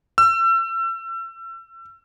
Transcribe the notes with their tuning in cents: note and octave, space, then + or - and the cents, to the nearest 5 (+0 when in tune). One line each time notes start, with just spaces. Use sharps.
E6 +35